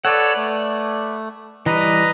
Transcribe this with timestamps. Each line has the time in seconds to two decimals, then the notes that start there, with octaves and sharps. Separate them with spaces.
0.05 A4 B4 C#5 D5 F#5 E6
0.36 A3
1.66 E3 G3 B4 D#5 A#5